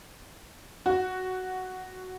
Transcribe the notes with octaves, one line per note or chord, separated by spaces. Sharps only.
F#4